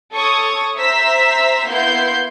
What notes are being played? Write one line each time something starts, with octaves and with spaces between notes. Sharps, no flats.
A4 C#5 C#6 D#6 G#6
C5 E5 A#5 E6 B6
A#3 B3 E4 C6 G6